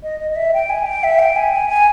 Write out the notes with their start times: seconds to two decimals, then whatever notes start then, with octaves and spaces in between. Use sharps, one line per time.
0.03 D#5
0.20 D#5
0.31 D#5
0.36 E5
0.54 G5
0.69 G#5
0.86 G5
1.04 E5
1.19 G5
1.36 G#5
1.53 G#5
1.69 G#5